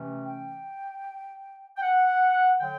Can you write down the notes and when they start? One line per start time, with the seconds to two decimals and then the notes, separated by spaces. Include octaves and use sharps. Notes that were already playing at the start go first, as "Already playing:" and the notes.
Already playing: C3 E3 A3 C#4
0.26 G5
1.77 G5
1.82 F#5
2.60 D3 F#3 G5